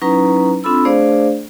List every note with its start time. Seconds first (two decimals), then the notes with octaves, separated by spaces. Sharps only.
0.02 F#3 C#4 D#4 E4 B4 A#5
0.64 C4 D4 F4 A4 B5 E6
0.85 A3 D4 G#4 C5 D5 F5